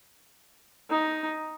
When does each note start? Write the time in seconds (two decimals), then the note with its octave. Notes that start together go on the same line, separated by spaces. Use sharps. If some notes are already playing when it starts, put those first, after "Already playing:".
0.90 D#4